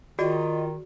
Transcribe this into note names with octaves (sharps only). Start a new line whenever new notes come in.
D#3 F4 F#4 G#4 D5 D#5